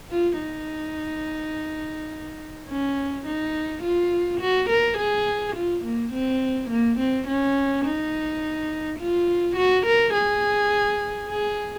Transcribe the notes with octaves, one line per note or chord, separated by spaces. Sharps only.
F4
D#4
C#4
D#4
F4
F#4
A#4
G#4
F4
A#3
C4
A#3
C4
C#4
D#4
F4
F#4
A#4
G#4
G#4